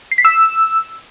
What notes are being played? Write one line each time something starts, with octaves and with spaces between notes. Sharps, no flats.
C7
B6
E6